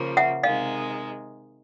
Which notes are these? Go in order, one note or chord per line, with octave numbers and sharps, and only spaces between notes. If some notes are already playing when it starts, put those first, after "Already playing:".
Already playing: C#3 F3 A#3
E5 F#5
C3 D#3 G#3 D#5 F5